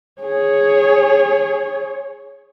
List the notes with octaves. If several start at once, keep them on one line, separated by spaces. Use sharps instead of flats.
G#4 C#5